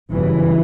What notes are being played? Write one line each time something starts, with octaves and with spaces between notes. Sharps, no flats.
G1 F#2 C#3 E3